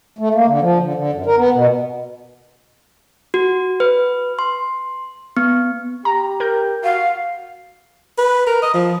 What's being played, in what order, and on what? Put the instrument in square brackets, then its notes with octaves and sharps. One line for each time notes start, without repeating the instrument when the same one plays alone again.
[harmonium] A3
A#3
D3
F3
D3
D3
F#2
A#4
B3
B2
[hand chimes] F#4
B4
C6
B3
[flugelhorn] G4 [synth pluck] A#5
[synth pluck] A#4 G6
[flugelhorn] F#4 [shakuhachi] F5
[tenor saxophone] B4
A#4
D#5
F3